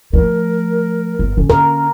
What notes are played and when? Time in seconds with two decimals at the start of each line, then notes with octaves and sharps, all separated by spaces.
0.13 F3 A3 A#4
1.19 G1
1.37 D3 C#4
1.50 A#4